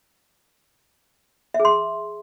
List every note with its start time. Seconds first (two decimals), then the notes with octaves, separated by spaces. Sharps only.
1.54 E5
1.60 G#4
1.65 C6